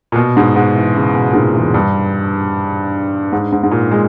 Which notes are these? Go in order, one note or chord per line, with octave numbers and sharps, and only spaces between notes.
A#2
B2
G#2
G#2
E3
C#3
B2
A#2
G#2
E2
G2
G#2
G#2
G#2
A#2
G#3